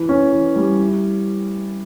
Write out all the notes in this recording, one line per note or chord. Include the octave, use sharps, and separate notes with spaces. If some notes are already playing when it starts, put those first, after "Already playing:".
Already playing: E3
C#4
E3
G3
E4